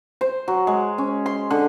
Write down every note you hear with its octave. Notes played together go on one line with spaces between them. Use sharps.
C5
F#3
G#3
C#4
C6
D3